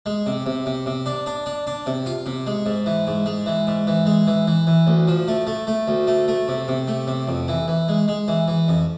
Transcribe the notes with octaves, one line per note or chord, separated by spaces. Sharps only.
G#3
C3
C3
C3
C3
D4
D4
D4
D4
C3
F4
C3
G#3
G#2
E3
G#2
G#3
E3
G#2
E3
G#3
E3
E3
E3
D2
F3
A3
A3
A3
D2
A3
A3
C3
C3
A3
C3
F2
E3
E3
G#3
G#3
E3
E3
F2